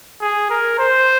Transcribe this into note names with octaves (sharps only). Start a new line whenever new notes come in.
G#4
A#4
C5